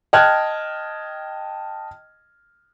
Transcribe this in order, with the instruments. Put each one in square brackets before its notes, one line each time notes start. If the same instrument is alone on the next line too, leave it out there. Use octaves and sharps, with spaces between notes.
[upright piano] D#5 G5 A5 F6 F#6 G#6